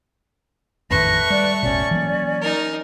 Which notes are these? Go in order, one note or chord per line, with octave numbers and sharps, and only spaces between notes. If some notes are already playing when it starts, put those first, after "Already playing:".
A1 F2 D#3 A3 B4 C#6 A#6
G3 D5
E1 A1 B2 C#4 D5
E3 F#3 A#3
D#4 A#4